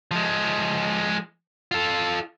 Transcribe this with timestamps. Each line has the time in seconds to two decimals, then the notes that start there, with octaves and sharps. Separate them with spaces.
0.11 F3 G#3
1.71 F4 A4